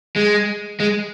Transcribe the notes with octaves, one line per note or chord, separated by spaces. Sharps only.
G#3
G#3